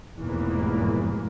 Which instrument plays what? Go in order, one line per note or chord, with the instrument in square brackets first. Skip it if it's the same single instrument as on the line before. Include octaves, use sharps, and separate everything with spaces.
[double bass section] F1 E2 G#2 B2 E3 A#3